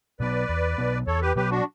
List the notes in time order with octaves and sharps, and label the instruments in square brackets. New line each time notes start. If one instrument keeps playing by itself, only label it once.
[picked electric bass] B2 F#3 B3 [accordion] B4 D5
[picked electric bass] E2
B2 F#3 B3
[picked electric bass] E2 [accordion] A4 C#5
[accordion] G4 B4
[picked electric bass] B2 F#3 B3 [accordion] G4 B4
[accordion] D4 F#4